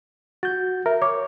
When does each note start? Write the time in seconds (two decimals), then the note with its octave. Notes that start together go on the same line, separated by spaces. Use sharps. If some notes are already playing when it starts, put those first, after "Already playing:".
0.43 F#4 G6 A6
0.86 A#4 E5
1.02 C#5 D6